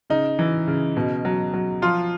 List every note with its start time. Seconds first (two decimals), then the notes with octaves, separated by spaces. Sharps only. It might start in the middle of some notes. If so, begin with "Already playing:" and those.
0.10 C#3 D#4
0.39 E3
0.67 C#3
0.96 B2
1.25 F#3
1.54 F#3
1.82 F3 F4